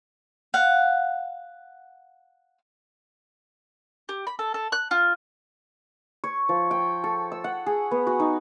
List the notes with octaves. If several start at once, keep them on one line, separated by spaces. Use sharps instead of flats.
F5 F#5
G4
B5
A4
A4
F#6
F4
C#5
F3
G5
A4
E6
F#5
G#4
B3
F#4
D#4